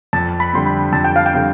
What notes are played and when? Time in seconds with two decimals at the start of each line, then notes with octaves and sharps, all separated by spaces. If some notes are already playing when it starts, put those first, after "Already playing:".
0.13 F2 A5
0.40 B5
0.53 D3 G3 C4 C6
0.66 B5
0.93 F2 A5
1.05 G5
1.16 F5
1.26 G5
1.33 D3 G3 C4